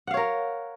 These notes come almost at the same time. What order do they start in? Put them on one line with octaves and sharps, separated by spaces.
F#5 F5 C#5 A#4